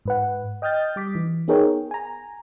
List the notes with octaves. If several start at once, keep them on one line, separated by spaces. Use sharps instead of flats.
G#2 B4 F#5
D#5 G5 D#6 F6 G6 A6
G3 D6 B6
E3
B3 D#4 G#4 A#4 C#5 G5
G#5 A#5